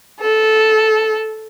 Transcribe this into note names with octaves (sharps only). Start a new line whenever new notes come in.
A4